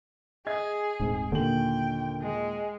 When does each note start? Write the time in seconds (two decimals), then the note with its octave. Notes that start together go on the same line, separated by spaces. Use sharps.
0.47 G#4 D#5 G#6
1.00 D#1 G#2 C4 G#5
1.32 D#2 A#2 D3 G5 F#7
2.21 G#3